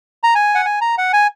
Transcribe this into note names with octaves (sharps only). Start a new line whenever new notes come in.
A#5
G#5
F#5
G#5
A#5
F#5
G#5